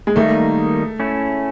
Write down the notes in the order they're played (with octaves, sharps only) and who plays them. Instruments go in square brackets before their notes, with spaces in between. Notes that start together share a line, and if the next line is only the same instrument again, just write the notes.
[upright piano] G#3
[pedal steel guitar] D#3 G3 A#3 D#4 [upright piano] A3
[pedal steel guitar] A3 C#4 E4